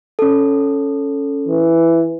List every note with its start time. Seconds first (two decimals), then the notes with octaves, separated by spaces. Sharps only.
0.19 C#4 A4
1.48 E3